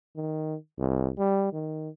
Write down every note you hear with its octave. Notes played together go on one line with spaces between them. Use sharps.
D#3
C2
G3
D#3